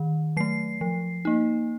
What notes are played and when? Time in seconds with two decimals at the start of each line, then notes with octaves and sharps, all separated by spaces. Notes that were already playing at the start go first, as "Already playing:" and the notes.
Already playing: D#3
0.37 F#3 A3 C7
0.81 F3
1.25 A#3 D#4